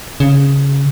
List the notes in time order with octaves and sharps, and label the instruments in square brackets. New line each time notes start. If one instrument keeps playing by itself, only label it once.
[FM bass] C#3